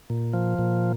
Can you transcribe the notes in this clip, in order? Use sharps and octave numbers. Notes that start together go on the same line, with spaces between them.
A#2
F3
A#2